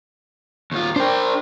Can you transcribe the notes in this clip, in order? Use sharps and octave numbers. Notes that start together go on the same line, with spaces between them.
D#2 F4
D4 A#4 C5 G5